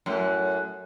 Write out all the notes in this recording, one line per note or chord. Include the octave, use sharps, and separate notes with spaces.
F#2 A2